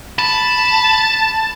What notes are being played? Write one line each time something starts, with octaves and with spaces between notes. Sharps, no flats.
A5 B5